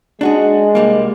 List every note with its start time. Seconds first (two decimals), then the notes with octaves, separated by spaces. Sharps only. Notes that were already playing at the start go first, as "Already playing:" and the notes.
0.21 G#3 D4 F#4 G#4
0.75 C2 G3 A#3